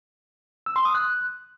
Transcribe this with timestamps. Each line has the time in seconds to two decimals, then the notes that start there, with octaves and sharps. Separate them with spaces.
0.66 E6
0.76 C6
0.85 D#6
0.95 F#6